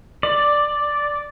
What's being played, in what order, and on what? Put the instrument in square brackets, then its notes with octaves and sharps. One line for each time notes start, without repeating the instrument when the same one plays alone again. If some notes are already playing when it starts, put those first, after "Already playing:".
[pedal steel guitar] D5